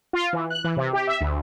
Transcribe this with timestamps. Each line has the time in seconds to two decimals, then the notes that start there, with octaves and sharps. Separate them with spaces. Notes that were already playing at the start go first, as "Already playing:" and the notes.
0.13 F4
0.33 E3
0.50 F#6
0.64 E3
0.77 C3
0.93 G4
1.07 E5
1.21 D2